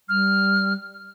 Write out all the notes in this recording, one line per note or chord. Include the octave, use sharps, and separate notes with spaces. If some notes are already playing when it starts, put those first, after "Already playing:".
G3 F6